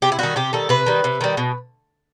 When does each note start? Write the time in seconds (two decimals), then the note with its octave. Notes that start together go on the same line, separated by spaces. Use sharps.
0.02 C3 G4
0.12 E4
0.19 D#3 G3 F#4
0.36 C3 G4
0.53 D#3 G3 A4
0.69 C3 B4
0.86 D#3 G3
1.04 C3
1.21 D#3 G3
1.37 B2